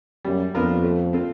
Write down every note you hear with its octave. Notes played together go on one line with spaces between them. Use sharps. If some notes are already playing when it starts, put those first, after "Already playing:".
F#2 G3
F2 B3 D4 F4 A#4
A3
C4 F4 A4